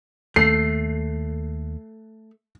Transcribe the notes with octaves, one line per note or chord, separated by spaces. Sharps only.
D#2 A3 C7